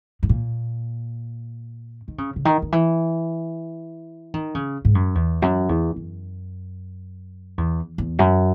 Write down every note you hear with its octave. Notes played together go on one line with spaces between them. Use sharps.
G#2
A#2
D#3
C#3
C#3
D#3
D#3
E3
D#3
C#3
G#2
F#2
E2
F#2
E2
F#2
E2
E2
F#2